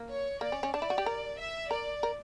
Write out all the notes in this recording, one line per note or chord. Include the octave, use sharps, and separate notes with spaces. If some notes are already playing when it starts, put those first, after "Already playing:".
Already playing: A#3
C#5
A#3 D5
C#4
C#4
D4 D5
E4
F#4
G4
A#4
E5
A#4 D5
A#4